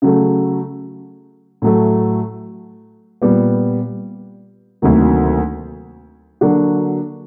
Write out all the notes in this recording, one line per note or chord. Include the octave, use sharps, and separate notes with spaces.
C#3 F#3 A3
A2 F#3 A3
A#2 G3 B3
D2 C3 D#3 F#3 A#3
D3 F#3 A#3 D4 F#4